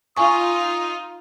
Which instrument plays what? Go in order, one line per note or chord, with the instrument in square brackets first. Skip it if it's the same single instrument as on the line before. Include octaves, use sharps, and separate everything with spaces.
[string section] D#4 F4 [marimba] G#5 C#6 [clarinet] D#6